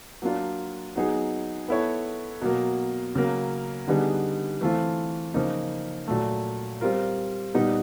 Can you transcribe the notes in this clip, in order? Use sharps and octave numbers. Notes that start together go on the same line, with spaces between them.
F#3 A#3 D4 F4
F#3 B3 D#4 G#4
B3 E4 A4 C#5
B2 F#3 A#3
C#3 F#3 A#3
D3 G3 B3 D#4 G#4
E3 A3 C4 F4
C#3 F3 A#3 D#4
A#2 F#3 A3
G3 C4 F4 A#4
A#2 G3 B3 D#4